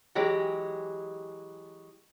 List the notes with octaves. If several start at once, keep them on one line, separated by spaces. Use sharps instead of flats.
E3 F#3 G#3 G4